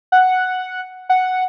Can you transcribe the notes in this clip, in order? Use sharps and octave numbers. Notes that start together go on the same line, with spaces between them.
F#5
F#5